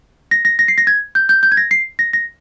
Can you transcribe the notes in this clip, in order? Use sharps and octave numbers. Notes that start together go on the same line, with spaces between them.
A#6
A#6
A#6
C7
A#6
G#6
G6
G6
G6
G#6
A#6
C7
A#6
A#6